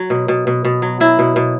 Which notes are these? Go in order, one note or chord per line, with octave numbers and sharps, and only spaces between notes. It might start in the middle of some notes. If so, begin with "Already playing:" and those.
Already playing: F#3
B2
B2
B2
B2
F#3
F#3 E4
B2
B2